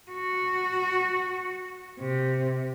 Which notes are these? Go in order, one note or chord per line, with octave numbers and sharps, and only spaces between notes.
F#4
C3